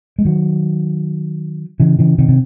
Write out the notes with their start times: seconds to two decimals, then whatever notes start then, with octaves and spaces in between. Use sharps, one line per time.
0.19 G#3
0.25 D#3 F#3
1.80 C#3 E3
1.99 C#3 E3
2.18 C3 D#3
2.29 C3